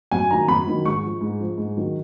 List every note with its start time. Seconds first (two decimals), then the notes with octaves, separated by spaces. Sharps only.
0.11 F#2 G#5
0.31 D#3 F#3 A#5
0.48 F#2 B5
0.67 D#3 F#3
0.85 G#2 C#6
1.03 F3
1.21 G#2
1.40 F3
1.58 G#2
1.77 D#3 F#3